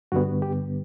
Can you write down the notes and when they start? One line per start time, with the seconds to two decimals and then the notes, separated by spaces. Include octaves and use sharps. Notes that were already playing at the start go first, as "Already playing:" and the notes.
0.12 G2 D3 G3 B3 F#4
0.42 G4